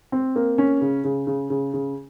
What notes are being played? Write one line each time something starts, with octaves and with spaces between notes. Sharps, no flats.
C4
A#3
C#4
C#3
C#3
C#3
C#3
C#3